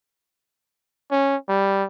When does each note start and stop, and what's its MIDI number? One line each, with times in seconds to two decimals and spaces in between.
1.11 1.36 61
1.49 1.84 55